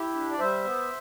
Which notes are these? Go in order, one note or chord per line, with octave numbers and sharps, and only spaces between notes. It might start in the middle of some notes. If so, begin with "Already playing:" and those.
Already playing: E4 G4
D4
D5
G3 C5 E5
B3